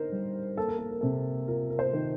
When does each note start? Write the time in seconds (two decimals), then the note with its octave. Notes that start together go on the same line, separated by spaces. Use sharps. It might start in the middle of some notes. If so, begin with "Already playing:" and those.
Already playing: D3 D#4 A#4 C5
0.12 G3
0.57 A#3 A4
0.68 A#4
0.79 A4
0.91 A#4
1.01 C3 A4
1.48 F4 A#4
1.70 A#4
1.79 C5
1.93 D#3